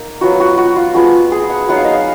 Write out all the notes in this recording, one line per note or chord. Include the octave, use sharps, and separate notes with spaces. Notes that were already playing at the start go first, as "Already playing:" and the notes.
Already playing: A#3 D#4
F#3 B3 F4 F#4
F#4
F#4
F4
F3 G#3 B3 F#4
G#4
F#5
F#3 B3 D#4 F#5
F5
D#5
F5